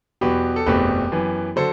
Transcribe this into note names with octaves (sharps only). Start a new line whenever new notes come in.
E2 B2 F#3 G4 B4
A4
F#1 E2 B2 A3 C4 G4 B4
F#2 E3 B3
D3 F#3 A4 C5